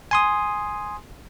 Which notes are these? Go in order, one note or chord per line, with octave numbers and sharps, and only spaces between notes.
G#5 C6 D#6